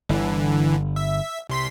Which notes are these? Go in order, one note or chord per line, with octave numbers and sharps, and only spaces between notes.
G1 D3 E3
E5
C2 C6 B6